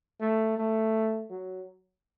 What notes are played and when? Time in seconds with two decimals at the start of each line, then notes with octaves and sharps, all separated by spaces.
0.20 A3
0.58 A3
1.30 F#3